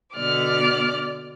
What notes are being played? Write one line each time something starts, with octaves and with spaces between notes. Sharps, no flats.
B2 D3 D5 D6 F6